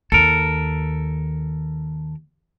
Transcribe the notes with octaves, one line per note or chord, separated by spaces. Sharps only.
D#2 A4 A#4